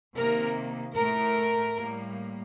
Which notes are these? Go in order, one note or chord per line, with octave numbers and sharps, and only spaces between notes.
C3 D#3 A#3 A#4
A2 A3 A#4
A2 G3 A#3